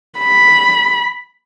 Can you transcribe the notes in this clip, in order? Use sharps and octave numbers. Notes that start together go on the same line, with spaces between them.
B5